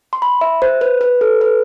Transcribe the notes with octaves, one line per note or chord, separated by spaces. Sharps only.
C6
B5
E5
C5
B4
B4
A4
B4